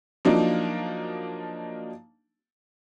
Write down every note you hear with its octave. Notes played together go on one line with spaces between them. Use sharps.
F3 F#3 A#3 D4 D#4